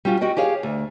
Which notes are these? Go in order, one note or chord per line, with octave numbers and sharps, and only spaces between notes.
G3 C#4 F4 F#4
F#4 G4 D#5 G5
G4 G#4 C#5 F5
D2